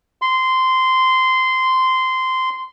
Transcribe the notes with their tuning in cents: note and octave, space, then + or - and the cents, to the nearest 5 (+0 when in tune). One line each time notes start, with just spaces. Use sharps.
C6 -15